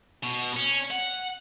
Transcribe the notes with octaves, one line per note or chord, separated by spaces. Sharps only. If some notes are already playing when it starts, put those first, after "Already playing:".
B2
C#4
F#5